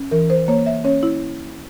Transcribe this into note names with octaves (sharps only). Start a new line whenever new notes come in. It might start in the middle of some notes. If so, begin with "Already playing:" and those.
Already playing: C#4
E3 A#4
C5
A#3 C#5
E5
C#4 C#5
E4